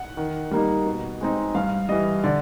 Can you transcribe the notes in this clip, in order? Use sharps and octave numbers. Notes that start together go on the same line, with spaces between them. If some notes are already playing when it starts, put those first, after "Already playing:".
Already playing: F#5
D#3
G3 A#3 D#4
B2
G#3 C4 D#4
G2 F5
E3 G3 D#5
D3 D5